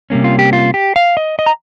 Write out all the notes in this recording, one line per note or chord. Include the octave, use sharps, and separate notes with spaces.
C3 G3 A#3 C#4
F4
G4
F4
G4
F5
D#5
D#5
A#5